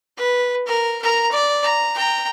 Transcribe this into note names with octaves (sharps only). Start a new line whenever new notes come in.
B4
A#4
A#4 A#5
D5
A#5
G5 A#5